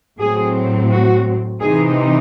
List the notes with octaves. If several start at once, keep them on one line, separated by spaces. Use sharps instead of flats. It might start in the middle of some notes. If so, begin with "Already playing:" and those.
A2 F#3 C4 G#4
F#4
C3 E3 C4 D#4 G#4